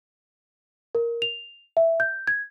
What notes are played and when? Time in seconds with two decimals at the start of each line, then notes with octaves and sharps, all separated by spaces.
0.95 A#4
1.22 F7
1.77 E5
2.00 G6
2.27 G#6